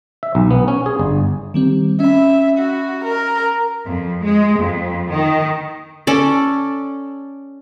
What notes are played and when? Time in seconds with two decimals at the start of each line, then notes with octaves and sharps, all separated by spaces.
0.23 E5
0.35 B1
0.51 B3
0.68 C#4
0.86 G#4
0.99 G1
1.54 D#3 G3 C4
2.00 C#4 E5 B5
2.58 F#4
3.04 A#4
3.85 F2
4.23 G#3
4.60 F2
5.11 D#3
6.07 C#4 A4 D5